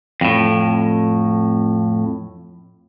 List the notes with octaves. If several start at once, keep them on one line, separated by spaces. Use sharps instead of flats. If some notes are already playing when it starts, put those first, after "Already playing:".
F2 A2